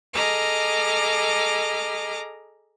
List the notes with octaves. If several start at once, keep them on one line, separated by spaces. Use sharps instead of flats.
G#4 A4 D#5 A#5 D6 F6